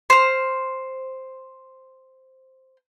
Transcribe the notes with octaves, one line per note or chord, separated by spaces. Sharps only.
C5 F6